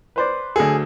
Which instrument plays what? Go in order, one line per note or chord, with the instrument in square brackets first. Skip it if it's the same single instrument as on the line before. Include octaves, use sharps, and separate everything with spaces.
[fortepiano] B4 C5 D5
[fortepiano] D2 F#3 A4 [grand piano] G#4